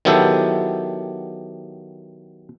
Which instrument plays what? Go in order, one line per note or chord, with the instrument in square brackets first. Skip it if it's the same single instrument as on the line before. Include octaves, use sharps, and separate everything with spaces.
[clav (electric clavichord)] D#3 F#3 B3 E4 G4 A4